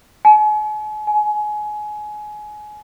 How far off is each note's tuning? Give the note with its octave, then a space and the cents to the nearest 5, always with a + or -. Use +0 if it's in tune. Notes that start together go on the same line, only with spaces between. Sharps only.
G#5 +45
G#5 +25